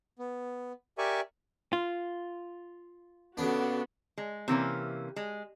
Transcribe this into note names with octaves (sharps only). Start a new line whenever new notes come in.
B3
G4 A#4 D5 E5 G#5 C#6
F4
C#3 B3 D4 F#4 A4
G#3
C3 E3 A#3 C#4
G#3